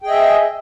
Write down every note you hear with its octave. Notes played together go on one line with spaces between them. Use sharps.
G#4 D#5 E5 G5